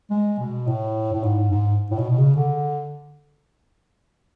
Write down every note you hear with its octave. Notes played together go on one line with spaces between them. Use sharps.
G#3
B2
A2
A2
G#2
G#2
A2
B2
B2
C#3
D3